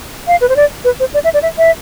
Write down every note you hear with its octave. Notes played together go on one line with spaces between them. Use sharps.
F5
B4
C5
D5
B4
C5
D5
E5
D5
E5
E5